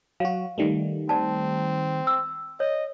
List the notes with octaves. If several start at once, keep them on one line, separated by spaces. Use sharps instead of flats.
F#3 F#4 F5
D#3 G3 A3
C4 D5 A5
E6
C#5 D#5